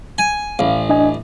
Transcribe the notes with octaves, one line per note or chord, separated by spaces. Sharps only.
G#5
A1 F5
D4 D#5 G#5